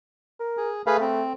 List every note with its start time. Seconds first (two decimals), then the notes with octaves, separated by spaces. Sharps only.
0.40 A#4
0.57 G#4
0.86 A3 G#4 B4 F5
1.01 C4